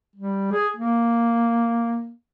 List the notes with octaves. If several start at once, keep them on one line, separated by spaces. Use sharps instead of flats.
G3
G#4
A#3